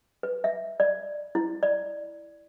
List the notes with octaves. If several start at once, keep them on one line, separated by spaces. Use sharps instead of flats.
B4
E5
D5
E4
D5